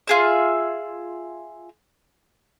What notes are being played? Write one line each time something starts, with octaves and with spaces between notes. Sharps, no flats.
F4 G#4 E5